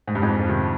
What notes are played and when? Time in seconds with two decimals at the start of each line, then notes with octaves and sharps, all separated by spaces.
0.07 G#2
0.15 G2
0.22 F2 G#2
0.40 F3
0.49 C3 D#3